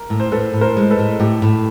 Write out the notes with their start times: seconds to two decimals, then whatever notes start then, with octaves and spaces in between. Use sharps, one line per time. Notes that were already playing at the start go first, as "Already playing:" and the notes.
Already playing: A#4
0.10 A2
0.20 C5
0.32 A2 A4 B4
0.53 A2
0.61 A#4 C5
0.77 G#3
0.91 A4 B4
0.99 A2
1.20 A2 G4
1.42 A2